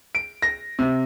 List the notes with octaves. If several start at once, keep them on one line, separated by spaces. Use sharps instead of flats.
D7
A#6
C3